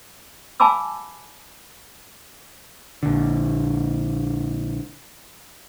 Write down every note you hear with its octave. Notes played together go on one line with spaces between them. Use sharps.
F5 G#5 A5 B5 D6 E6
A#1 D3